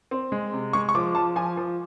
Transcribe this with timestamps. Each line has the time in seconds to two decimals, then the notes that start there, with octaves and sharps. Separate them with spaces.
0.11 C4
0.32 G#3
0.53 C3
0.73 G#3 C#6
0.89 C#6
0.95 F3 D6
1.15 F3 A5
1.36 F3 G#5
1.57 F3